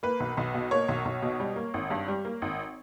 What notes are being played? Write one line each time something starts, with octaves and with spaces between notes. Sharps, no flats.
A#3 B4
B1
B1
B2
A#3 C#5
B1
B1
B2
G3
A#3
G#1
G2
G3
A#3
G#1